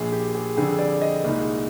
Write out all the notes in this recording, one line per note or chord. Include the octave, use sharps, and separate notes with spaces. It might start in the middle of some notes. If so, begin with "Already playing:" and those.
Already playing: A#1 A#2 F3 G#4
G4
G#4
F2 D3 G3 G#4
D5
D#5
C2 A#2 G#3 D#4